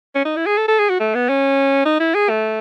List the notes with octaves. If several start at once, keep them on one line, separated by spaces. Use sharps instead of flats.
C#4
D#4
E4
G#4
A4
A4
G#4
F#4
A3
B3
C#4
D#4
E4
G#4
A3